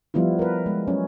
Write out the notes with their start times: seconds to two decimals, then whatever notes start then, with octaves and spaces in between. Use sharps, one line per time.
0.14 F3 G3 B3 E4 F4
0.39 A#4 B4
0.66 G#3
0.87 F#3 C#4